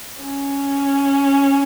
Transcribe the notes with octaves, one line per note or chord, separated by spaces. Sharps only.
C#4